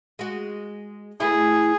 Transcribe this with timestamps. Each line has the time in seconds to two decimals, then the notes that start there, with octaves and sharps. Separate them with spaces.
0.19 G#3 F#4
1.20 E3 A3 E4 G#4